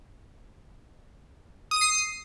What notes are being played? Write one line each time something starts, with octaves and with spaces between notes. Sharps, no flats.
D#6 C7 D#7